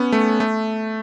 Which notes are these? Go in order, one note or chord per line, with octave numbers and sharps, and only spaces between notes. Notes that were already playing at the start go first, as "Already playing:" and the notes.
Already playing: B3 C#4
A3
A3